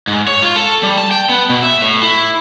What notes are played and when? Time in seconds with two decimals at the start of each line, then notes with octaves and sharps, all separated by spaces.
0.08 G#2
0.27 C#5
0.42 F4
0.56 A4
0.83 G3
0.98 A5
1.11 G5
1.29 B3
1.50 B2
1.63 E5
1.82 A2
2.03 E4